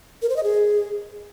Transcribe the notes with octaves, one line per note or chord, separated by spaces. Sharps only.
A#4
C5
D#5
G#4